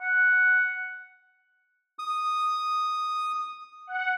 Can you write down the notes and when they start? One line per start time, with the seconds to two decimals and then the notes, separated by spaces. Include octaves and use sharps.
0.01 F#5
1.99 D#6
3.87 F#5